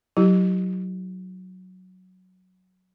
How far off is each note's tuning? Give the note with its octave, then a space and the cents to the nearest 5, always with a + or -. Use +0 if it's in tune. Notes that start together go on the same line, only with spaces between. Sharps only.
F#3 +0 E4 +5 G4 +0